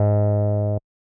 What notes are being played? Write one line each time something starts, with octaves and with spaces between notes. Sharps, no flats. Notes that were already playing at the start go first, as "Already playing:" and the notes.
Already playing: G#2